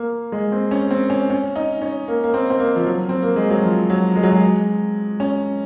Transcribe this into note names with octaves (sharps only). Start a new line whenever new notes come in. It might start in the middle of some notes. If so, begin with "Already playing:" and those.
Already playing: A#3
G#3
C4
C#4
C4
C#4
C#4
D#4
C#4
A#3
A#3
C4
C4
A#3
F3
F#3
C4
A#3
G#3
F#3
F3
F#3
G#3
F#3
G#3
C#4